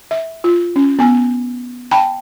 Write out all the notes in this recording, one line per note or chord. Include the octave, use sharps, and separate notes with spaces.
E5
F4
C#4
B3 G#5
G5 A5 B5